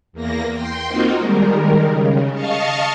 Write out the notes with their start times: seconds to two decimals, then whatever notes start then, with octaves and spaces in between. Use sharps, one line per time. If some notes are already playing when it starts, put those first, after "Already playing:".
0.13 E2 A#3 A#6
0.54 G5 C6
0.87 A#3 C4 D#4 F4 F#4
1.16 D#3 G3 G#3 A#4
1.84 C#3
2.34 D#5 F5 A5 C#6 F6